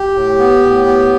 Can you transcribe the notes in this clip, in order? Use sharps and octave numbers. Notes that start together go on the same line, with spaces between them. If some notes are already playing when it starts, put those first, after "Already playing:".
Already playing: G4
A2
B3
A2
B3